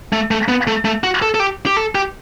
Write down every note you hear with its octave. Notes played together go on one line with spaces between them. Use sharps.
A3
A3
B3
A3
A3
F#4
A4
A4
G4
G4
A4
G4